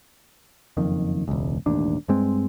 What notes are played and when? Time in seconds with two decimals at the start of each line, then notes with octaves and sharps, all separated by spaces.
0.77 F#1 F2 D#3
1.28 E1 C#2
1.66 E1 A1 D#2 D4
2.08 G2 G#3 C4